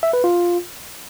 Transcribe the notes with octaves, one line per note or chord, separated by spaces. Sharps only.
E5
B4
F4